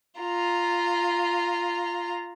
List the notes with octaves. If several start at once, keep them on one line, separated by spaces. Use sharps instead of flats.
F4 A#5